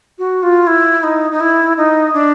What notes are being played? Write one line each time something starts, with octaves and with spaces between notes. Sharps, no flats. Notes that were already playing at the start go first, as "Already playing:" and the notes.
F#4
F4
E4
D#4
D#4
E4
D#4
D4